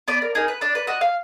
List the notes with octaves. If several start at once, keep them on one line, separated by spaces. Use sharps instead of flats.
B3 D5
A#4
D#4 G#4 A#4
B4
D4 D5
B4
F#4 D#5
F5